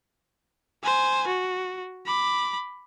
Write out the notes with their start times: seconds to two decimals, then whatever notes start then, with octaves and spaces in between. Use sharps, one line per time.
0.83 C5 G#5
1.28 F#4
2.06 B5 D6